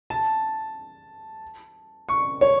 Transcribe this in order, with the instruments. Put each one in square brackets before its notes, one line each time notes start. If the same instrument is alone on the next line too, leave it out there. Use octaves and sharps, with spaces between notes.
[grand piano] A5
C#6
C#5